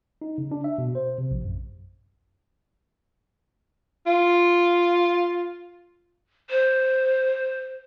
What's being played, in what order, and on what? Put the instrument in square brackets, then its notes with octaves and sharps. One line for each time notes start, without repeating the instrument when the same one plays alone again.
[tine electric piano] D#4
C#3
D4
E5
B2
C5
C3
A#1
F#2
[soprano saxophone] F4
[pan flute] C5